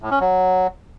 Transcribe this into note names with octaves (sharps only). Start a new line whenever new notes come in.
A2
C#4
F#3